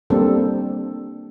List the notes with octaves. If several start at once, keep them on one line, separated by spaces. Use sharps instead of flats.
G3 A#3 C4 D4 A4